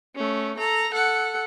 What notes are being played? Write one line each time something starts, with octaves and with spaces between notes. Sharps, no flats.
A3 C#4
A4 A#5
A4 F#5